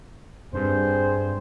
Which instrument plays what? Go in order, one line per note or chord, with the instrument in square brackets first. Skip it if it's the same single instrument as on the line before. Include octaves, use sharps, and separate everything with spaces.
[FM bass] G2 [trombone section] C4 G#4 C5